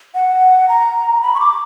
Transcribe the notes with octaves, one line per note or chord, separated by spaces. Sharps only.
F#5
A#5
B5
C#6
D6